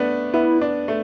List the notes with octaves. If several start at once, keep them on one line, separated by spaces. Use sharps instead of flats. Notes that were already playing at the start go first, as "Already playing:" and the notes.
Already playing: A3 B3 D4
B3 E4
D4
A3